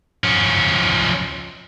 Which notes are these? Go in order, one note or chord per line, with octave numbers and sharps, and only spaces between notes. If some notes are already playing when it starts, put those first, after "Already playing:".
F3 C#4